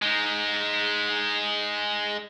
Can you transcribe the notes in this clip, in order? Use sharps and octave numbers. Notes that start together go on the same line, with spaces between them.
G#3 D#4